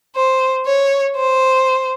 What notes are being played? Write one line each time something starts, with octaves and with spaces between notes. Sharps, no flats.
C5
C#5
C5